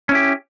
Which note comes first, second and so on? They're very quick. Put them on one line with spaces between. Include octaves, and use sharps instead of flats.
C#4 E4 G4